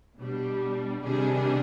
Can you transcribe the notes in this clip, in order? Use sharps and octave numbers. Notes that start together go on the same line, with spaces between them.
B2 G3 D4
C3 D#3 G3 D4 G#4